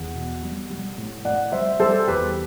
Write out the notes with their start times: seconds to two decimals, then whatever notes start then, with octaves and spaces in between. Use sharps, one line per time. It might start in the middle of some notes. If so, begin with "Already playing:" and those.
Already playing: E2 F#5
0.14 B2
0.43 G3
0.70 G3
0.98 A2
1.25 A2 D5 F#5
1.52 G3 C5 E5
1.79 G3 A4 C5
2.07 E2 G4 B4